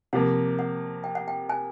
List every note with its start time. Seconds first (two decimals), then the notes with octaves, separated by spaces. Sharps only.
0.13 C3 F3 A#3 F#5
0.59 F#5
1.04 G5
1.15 F#5
1.28 G5
1.49 G#5